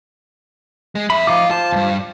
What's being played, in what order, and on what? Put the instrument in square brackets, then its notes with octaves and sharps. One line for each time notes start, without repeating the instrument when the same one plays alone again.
[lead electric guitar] G#3
[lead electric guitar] F2 E5 [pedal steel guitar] B5
[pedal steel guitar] F3 D#4 D6 [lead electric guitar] F4 F5
[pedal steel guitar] F4 C5 [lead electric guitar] A5
[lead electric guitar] E2 G2